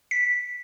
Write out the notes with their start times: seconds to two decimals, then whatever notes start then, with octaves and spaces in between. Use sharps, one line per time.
0.11 B6